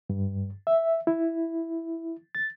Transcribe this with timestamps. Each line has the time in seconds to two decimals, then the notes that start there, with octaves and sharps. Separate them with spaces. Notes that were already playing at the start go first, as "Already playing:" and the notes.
0.10 G2
0.67 E5
1.07 E4
2.35 A6